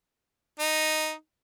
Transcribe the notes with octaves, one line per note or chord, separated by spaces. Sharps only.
D#4